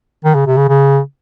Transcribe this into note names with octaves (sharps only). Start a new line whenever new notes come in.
D#3
C#3
C3
C#3
C#3